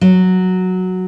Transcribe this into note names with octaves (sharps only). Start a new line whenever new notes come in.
F#3